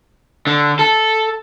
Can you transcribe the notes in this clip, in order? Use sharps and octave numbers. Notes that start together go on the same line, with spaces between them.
D3
A4